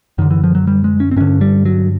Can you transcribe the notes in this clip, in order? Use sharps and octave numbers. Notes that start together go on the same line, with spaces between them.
F#2 D3 D#3
E3
F3
F#3
G3
G#3
C#4
C4
G2 D3 C#4
G3
F#3